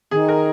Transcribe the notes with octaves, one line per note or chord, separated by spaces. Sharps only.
D#3 G#4
A#4